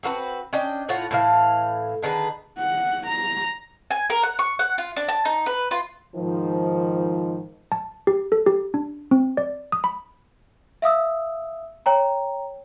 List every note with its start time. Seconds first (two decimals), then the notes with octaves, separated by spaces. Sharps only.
0.03 C4 F#4 A#4 B4
0.53 C#4 D4 D#5 G5
0.89 A2 F4 C#5 F#5
1.11 A2 E3 F5
2.02 D3 D#3 G#4 B4
2.59 F#5
3.07 A#5
3.91 G#5
4.10 A#4
4.23 F#5
4.39 C#6
4.59 F#5
4.78 F4
4.96 D4
5.08 A5
5.25 D#4
5.46 B4
5.71 F4
6.15 G#2 D#3 F3
7.72 A5
8.07 G4
8.32 A4
8.46 G4
8.74 D4
9.11 C4
9.37 D5
9.72 D#6
9.84 B5
10.82 E5 F5 D#6 E6
11.86 C#5 G5 A#5